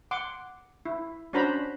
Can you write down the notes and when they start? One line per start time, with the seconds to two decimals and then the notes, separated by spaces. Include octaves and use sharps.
0.11 F#5 C6 D6
0.85 E4
1.33 C#4 D4 F#4 C5 A#5 B5